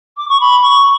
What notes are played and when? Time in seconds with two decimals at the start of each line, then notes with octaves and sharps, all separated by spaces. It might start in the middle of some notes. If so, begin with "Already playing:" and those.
0.17 D6
0.29 C#6
0.40 B5
0.62 C#6